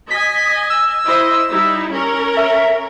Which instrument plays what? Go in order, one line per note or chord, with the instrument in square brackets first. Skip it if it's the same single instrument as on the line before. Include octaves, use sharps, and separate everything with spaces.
[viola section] D#5 G#5 [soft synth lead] B6
[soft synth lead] E6
[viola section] E4 C5 D#5
G3 D#4 E4
C#4 A#4
[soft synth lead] E5